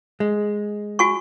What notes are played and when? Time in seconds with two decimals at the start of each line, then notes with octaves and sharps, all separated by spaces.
0.20 G#3
0.99 F#4 G#5 C#6